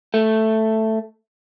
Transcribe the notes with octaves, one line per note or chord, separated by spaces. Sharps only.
A3